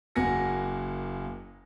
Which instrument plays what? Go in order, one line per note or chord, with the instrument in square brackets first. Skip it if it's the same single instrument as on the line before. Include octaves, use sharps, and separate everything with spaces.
[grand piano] F#1 A#3 F#4 G#5 A#6 C#7